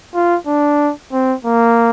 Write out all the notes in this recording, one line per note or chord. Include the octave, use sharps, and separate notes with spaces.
F4
D4
C4
A#3